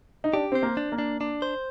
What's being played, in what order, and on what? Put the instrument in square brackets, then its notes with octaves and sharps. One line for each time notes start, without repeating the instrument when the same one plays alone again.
[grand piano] D#4
[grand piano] D4 [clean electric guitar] G4
[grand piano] C4 [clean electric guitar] C5
[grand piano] A#3
[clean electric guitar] D4
[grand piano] A#3
[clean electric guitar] D4
D4
C5